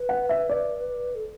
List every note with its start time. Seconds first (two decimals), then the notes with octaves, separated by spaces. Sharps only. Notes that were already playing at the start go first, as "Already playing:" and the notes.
Already playing: B4
0.09 F#5
0.29 E5
0.49 D5
1.15 A4